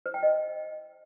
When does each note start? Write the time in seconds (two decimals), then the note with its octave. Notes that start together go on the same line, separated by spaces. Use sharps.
0.06 C5
0.14 G5
0.23 D#5